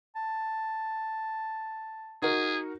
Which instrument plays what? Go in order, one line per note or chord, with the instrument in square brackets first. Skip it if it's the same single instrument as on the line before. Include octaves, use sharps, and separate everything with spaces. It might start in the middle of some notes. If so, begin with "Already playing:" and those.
[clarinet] A5
[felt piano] D#4 F#4 A#4 [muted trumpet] G#4